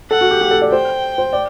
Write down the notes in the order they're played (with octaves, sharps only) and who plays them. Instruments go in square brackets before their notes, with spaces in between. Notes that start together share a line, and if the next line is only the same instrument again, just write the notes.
[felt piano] A4 [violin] F#5
[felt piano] F#4
G4
G4
A4
D5
[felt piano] C5 [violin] G5
[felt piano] C5
D5